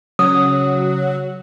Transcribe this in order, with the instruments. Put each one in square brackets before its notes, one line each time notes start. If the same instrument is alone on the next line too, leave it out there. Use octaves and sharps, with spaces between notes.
[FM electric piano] C#3 [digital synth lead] F#3 [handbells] D#6